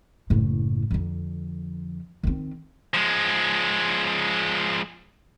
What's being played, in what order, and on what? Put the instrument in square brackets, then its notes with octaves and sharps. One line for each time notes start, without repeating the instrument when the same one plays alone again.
[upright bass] F#1 A2
F2 D3
D#3 C4
[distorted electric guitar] F3 G#3